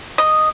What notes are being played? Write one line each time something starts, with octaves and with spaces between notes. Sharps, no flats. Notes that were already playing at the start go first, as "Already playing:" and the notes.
D#5